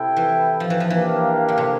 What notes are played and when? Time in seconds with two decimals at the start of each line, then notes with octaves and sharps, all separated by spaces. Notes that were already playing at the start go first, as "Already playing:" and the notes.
Already playing: C3 E4 A4 E5 G5
0.17 E3
0.60 F3
0.70 E3
0.80 F3
0.89 E3 A#3 D4 G4 A#4 F5
1.49 D3
1.58 C3